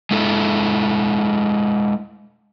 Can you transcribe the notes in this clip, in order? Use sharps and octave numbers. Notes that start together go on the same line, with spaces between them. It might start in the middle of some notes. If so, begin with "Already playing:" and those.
G#3 D4 E4 A4